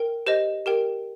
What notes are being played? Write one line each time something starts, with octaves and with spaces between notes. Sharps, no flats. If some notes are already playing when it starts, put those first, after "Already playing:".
Already playing: A#4 G5
G4 C5 D#5
G4 A#4 G5